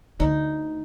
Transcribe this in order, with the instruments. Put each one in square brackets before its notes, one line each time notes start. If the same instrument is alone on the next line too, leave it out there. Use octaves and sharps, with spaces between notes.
[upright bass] D2 [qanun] D#4